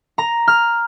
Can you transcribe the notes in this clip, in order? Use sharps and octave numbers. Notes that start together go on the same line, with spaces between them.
A#5
F6